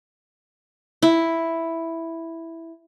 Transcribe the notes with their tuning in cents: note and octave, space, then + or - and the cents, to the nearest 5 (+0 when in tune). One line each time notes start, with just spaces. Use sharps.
E4 +0